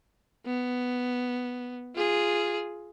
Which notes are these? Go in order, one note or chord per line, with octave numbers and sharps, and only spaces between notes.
B3
F4 G#4